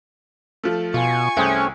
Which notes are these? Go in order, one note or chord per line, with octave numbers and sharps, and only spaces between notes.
F3 A3
B2 F4 G#5 C#6
C2 A3 C4 C#4 G#4